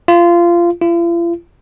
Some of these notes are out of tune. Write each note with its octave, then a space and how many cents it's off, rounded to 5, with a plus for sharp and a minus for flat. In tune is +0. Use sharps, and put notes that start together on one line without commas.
F4 -20
F4 -45